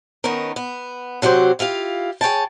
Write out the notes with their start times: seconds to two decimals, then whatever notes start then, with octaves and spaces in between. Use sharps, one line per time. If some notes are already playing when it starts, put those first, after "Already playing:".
0.24 D#3 B3 C#4 D#4 A#4
0.56 B3
1.22 C3 F#3 F#4 G4 C5
1.59 E4 F4 G4 F5
2.21 G#4 C#5 G5 A5